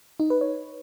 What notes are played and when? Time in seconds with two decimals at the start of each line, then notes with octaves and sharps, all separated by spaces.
0.20 D#4
0.30 B4
0.41 C#5